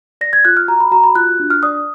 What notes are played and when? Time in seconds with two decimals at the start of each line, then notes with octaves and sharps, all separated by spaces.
0.21 D5 A#6
0.33 G#6
0.45 F4 F#6
0.57 F6
0.68 F#4 A#5
0.80 B5
0.91 F#4 A#5
1.04 B5
1.15 F4 F#6
1.40 D4
1.50 F6
1.63 D5 D#6